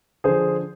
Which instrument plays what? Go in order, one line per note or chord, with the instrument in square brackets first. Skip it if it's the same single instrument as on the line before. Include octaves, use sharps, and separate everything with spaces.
[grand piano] D3 F3 G#4 C5